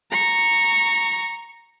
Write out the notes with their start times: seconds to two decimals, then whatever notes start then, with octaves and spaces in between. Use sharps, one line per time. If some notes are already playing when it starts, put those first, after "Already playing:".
0.11 A#5 C#6